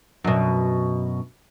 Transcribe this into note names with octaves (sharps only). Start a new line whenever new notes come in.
F#2 B2